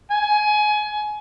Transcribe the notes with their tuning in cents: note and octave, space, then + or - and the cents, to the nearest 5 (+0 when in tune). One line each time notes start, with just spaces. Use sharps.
G#5 +25